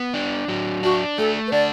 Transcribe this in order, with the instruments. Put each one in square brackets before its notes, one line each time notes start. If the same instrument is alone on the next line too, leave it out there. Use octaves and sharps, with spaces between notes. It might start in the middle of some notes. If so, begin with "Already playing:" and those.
Already playing: [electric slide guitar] B3
D4
F#3
[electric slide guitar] D4 [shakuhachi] F#4
[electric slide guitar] A3 [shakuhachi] A4
[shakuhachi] B4
[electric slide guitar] D4 [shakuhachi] D5